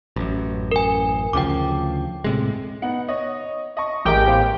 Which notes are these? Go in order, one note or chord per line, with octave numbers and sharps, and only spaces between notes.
A1 F#2
A#4 G#5
D2 C#3 F3 G5 D6
A2 C3 G#3
B3 D#4 F#5
C#5 D#5
D#5 A5 C#6
A1 G4 G#4 A#4 D#5 G5
B3 C5 F5